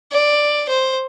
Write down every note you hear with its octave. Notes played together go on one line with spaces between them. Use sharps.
D5
C5